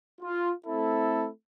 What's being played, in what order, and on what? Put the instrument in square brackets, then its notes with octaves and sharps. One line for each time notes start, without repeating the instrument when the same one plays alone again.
[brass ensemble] F4
A3 C4 E4 A4